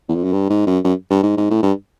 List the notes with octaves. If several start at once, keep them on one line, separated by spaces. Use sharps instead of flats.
E2
F2
F#2
G2
G#2
F#2
F#2
G2
G#2
G#2
A2
G2